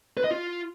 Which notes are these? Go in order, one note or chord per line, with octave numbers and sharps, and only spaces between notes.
B4
D#5
F4